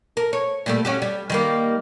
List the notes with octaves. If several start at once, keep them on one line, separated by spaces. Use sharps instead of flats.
A#4
C#5
A#2 G3 A3
C#4 F#4 G4
G3
D#3 G3 A#3